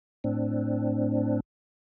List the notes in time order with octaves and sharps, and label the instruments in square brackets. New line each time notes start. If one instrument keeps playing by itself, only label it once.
[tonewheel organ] A2 C4 D4